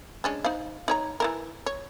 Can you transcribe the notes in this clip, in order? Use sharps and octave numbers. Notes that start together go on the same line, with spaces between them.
G#3 C#4 D4
D#4 C5 F5
D#4 C#5 A#5
E3 E4 A#4
C#5